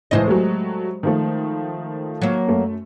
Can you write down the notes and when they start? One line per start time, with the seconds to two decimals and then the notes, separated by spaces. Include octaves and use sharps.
0.11 C#2 A2 E3 G#3 C5 D#5
0.28 F#3 G3 A3
1.03 D#3 F3 A3
2.22 F#3 A#3
2.47 F#2 A3